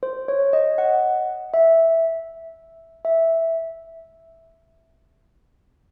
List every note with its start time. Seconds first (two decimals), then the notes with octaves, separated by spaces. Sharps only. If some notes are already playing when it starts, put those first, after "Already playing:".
0.03 C5
0.28 C#5
0.53 D#5
0.78 F#5
1.54 E5
3.05 E5